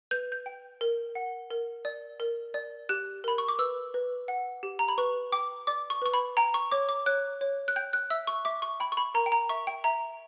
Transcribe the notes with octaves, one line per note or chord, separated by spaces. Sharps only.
B4 G6
G6
G5
A#4
F#5
A#4
D5
A#4
D5
G4 F#6
A#4 B5
C#6
D6
B4 E6
B4
F#5
G4
A#5
B5
B4 C#6
G5 D6
D5 D6
C#6
B4 C#6
B5
G5 A#5
C#6
C#5 D6
D6
C#5 F#6
C#5
F#6
G5 G6
F#6
E5 E6
C#6
E5 D6
C#6
G5 B5
C#6
B5
A#4 A#5
G5
A#5
E5 C#6
G5
E5 A#5